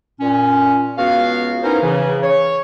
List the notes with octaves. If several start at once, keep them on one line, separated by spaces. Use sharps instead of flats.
A#2 C#4
C#2 B3 F#4 F5
B3 C#4 D#4 E4 A#4 C5
C#3 E3
C#5